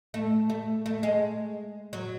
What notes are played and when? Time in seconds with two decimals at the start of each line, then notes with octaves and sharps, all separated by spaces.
0.14 A3
0.50 A3
0.86 A3
1.03 G#3
1.93 F#3